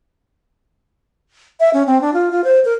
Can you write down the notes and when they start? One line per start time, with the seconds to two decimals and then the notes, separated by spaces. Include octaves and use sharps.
1.60 E5
1.73 C#4
1.87 C4
2.01 D4
2.14 F4
2.31 F4
2.44 C5
2.65 A#4